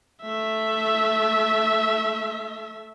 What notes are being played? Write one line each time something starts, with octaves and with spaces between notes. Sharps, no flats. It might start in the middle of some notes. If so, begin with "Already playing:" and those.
A3 E5